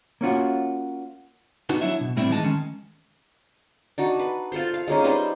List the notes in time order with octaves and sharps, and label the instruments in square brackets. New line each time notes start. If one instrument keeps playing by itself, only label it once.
[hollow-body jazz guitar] A#3 C#4 F4 F#4
[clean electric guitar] B3 D4 D#4 F#4
F#3 D4 E4 C#5 E5
B2
A2 G3 C4 D4 E4
E3 G#3 D#4 A5
D#3 G#3 C#4
[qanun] D4 D#4 F#4
B4
F4 A4 C5
F5
G#3 A#3 C#4 D#4
G3 D#4 B4 C5